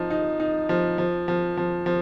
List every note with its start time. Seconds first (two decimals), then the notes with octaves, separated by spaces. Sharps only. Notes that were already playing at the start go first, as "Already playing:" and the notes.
Already playing: F3 D#4
0.10 D#4
0.40 D#4
0.69 F3
0.98 F3
1.28 F3
1.57 F3
1.86 F3